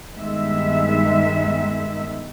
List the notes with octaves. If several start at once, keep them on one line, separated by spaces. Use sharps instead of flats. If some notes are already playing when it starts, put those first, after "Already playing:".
G2 D#3 G#3 B3 E5